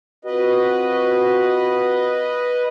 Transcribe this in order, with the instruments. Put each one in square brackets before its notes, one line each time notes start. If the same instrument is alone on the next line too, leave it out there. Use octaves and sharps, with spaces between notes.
[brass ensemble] C4 F4 F#4 [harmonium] B4 D#5